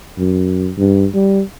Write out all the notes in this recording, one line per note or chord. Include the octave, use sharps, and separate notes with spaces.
F#2
G2
G3